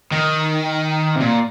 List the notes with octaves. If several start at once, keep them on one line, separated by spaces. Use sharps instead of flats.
D#3
C3
A#2